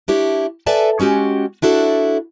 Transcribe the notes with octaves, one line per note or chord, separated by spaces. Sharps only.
D4 E4 G4 C#5
A4 B4 D5 E5 G#5 A5
G#3 C#4 F#4 G4
D4 E4 F#4 A4